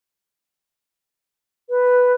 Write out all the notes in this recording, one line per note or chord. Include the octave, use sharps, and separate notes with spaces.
B4